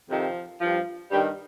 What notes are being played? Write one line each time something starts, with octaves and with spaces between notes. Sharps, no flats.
F2 C3 D#3 F3
G2 F3
G2 D#3 G3